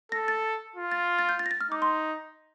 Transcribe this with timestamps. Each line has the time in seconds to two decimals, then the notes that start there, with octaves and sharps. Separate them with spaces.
0.12 A4 A#6
0.28 A6
0.76 F4
0.92 A6
1.19 A6
1.29 G6
1.39 A6
1.46 A#6
1.51 A6
1.61 F6
1.71 D#4 D6
1.82 C6